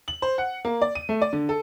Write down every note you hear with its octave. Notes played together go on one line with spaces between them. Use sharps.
F#7
C5
F#5
A#3
D5
D#7
A3
D5
D3
A4